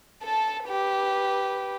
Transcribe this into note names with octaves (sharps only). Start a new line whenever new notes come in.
A4 A5
G4 B4